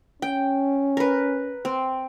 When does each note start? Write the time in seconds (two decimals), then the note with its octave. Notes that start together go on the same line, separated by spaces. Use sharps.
0.22 C#4 G5
0.97 A#4 B4
1.65 C4